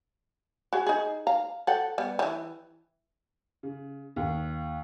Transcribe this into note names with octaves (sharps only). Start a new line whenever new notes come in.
F#4 G#4
D#4 G#4
F5 A#5
A4 F#5 G5
G3 B3
D#3 E3
C#3
D#2